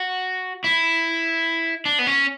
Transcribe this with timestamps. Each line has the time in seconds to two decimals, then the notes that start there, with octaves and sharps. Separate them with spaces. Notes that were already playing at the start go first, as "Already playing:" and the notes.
Already playing: F#4
0.64 E4
1.85 D4
1.99 B3
2.07 C#4